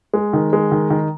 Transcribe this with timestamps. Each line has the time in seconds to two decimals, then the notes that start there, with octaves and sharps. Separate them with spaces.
0.13 G#3
0.33 D#3
0.53 G#3
0.71 D#3
0.90 D#3